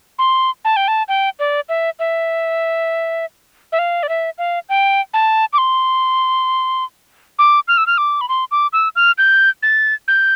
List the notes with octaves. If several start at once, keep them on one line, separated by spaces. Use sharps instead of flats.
C6
A5
G5
A5
G5
D5
E5
E5
E5
F5
D5
E5
F5
G5
A5
D6
C6
D6
F6
E6
F6
D6
B5
C6
D6
E6
F6
G6
A6
G6